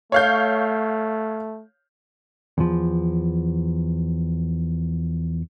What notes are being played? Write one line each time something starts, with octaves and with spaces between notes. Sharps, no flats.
A3 C#5 F5 G6
E2 F3